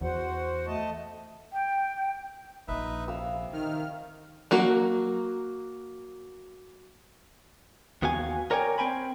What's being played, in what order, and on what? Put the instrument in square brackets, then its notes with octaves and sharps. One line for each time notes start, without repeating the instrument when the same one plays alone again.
[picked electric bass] E2 [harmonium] F#4 C5 F#5
[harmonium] A3 D#5 A5
[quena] G5
[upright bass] A#1 [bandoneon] D#4 B4 E5
[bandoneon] F2 C3 [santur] F5 E6
[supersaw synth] D#3 F6
[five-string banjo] F#3 A#3 F#4
[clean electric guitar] D#2 B3 F#4 F5 G#5
A#4 C#5 D5 G5 G#5
C4 G5 G#5 B5